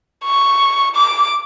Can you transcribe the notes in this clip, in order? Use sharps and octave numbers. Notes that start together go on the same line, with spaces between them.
C#6
D6